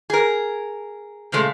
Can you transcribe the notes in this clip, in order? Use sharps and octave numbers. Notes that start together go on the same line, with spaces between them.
G#4 A#4
A#2 C#3 G#3 A3